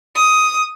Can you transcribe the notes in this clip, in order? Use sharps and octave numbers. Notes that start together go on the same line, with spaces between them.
D#6